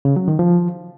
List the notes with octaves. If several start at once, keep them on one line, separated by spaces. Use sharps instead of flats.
C#3
F#3
D#3
F3